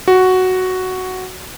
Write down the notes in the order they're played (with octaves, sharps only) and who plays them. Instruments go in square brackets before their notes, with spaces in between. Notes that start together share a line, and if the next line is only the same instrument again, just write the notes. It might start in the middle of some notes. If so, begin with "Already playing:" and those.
[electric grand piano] F#4